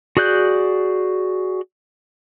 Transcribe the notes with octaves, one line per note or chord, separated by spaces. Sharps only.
F#4 G#4 D5 F#6 G6